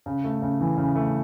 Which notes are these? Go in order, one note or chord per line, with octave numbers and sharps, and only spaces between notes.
C#3
A3
C#3
E3
C#3
A3